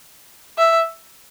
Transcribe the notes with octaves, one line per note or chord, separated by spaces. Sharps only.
E5